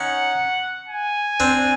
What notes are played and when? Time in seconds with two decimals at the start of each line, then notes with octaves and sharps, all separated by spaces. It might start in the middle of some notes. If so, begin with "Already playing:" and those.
Already playing: C#4 D#4 F#5
0.88 G#5
1.40 C4 D4